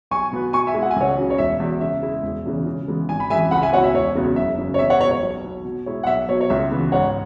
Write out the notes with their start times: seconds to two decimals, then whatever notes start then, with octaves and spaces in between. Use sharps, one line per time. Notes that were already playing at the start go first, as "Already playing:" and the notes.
0.11 B1 G#5 C#6
0.32 B2 B3 F#4 B4
0.53 B2 G#5 C#6
0.67 E5 G#5
0.74 G#3 E4
0.82 F#5
0.91 G#5
0.96 C#2 C#5 F#5
1.17 C#3 F#3
1.30 C#5
1.38 E1 E5
1.60 E2 B2
1.81 C#3 E5
2.03 G#3 E4
2.23 E1
2.45 E2 C#3 E3 G#3
2.66 C#3
2.88 E3 G#3 B3
3.09 G#1 G#5
3.20 B5
3.30 F#2 E3 G#3 E5 G#5
3.51 C#2 F#5 B5
3.62 E5 G#5
3.73 B2 F#3 E4 C#5 F#5
3.84 E5
3.94 E1 C#5
4.15 E2 C#3 F#3 B3
4.36 F#1 E5
4.58 F#2 C#3
4.74 C#5
4.79 E2 E5
4.90 C#5 F#5
5.01 B2 C#5
5.05 G#3
5.11 C#5
5.22 B1
5.43 B2 B3
5.65 B2
5.86 G#3 E4 C#5
6.03 F#5
6.07 B1 E5
6.28 B2 F#3 C#5
6.41 C#5
6.50 C#2 E5
6.71 C#3 E3 B3 F#4
6.92 G#2 C#5 F#5